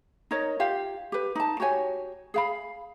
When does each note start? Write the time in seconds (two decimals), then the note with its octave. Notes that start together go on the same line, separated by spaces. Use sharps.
0.31 D#4 A#4 C#5 D#5
0.60 F4 G4 F5
1.12 G4 B4
1.35 D#4 A5
1.60 F#4 G4 C#5 G#5
2.34 G#4 F5 B5